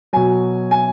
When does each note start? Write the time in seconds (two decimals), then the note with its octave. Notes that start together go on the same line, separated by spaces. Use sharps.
0.13 B2 F#3 G#5
0.71 G#5